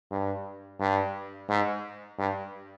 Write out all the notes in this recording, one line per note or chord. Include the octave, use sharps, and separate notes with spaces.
G2
G2
G#2
G2